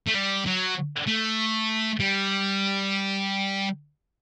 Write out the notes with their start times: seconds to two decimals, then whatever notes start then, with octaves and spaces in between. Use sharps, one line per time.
0.07 A3
0.14 G3
0.45 F#3
1.07 A3
2.00 G3